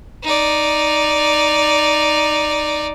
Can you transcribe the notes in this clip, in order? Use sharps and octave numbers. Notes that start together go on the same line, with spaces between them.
D#4 D5